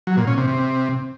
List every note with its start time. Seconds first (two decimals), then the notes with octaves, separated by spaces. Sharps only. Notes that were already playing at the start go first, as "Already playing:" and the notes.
0.07 F#3
0.17 A#2
0.27 C#4
0.38 C3
0.48 C3